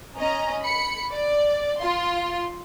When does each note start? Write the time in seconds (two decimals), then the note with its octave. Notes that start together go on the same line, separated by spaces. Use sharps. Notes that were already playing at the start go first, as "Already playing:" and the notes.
0.16 C#4 D#5 A#5
0.61 B5 C#7
1.10 D5
1.80 F4 C6